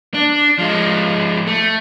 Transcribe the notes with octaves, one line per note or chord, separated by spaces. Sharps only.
D4
F3 G#3
A3